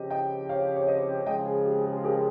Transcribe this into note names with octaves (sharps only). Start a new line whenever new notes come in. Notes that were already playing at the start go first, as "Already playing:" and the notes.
Already playing: C#3 F3 C4 G4 D#5
D#5 G5
C#5 F5
C#5
C5 D#5
C#3 F3 G#3 D#5 G5
G#4
G4
G#4
G#4
G4 A#4